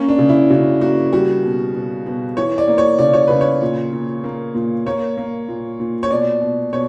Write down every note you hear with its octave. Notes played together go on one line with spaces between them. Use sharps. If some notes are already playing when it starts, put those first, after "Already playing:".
Already playing: A#3 C#4
D4
C#3
E4
C#3 F#4
A#3 F#4
G3 F#4
B2
B2
B2
E3 C#5
D5
A#3
C#5
C#3 D5
C#5
C#3 B4
C#5
A#2
A#2
A#3
A#2
A#3 C#5
A#3
A#2
A#2
C#5
B2 D5
B2
B2 C#5